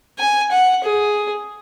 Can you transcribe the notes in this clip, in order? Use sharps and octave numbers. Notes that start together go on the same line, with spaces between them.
G#5
F#5
G#4